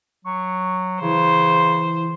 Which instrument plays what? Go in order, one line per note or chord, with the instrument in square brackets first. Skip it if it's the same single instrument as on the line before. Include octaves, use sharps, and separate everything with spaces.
[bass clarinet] F#3 [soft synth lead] C#6
[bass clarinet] C#3 [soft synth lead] E3 [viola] C5